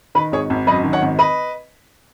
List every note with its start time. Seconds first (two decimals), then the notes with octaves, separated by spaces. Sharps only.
0.15 D#3 B4
0.32 G#1 G#4 C#5
0.50 G#1
0.67 F#2 B4 D#5
0.84 D#3
0.93 C#5 F#5
1.02 G#1
1.19 B4 D#5